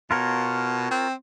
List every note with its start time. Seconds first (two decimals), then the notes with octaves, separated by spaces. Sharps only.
0.11 B2 F4 A#4 C#5
0.91 C4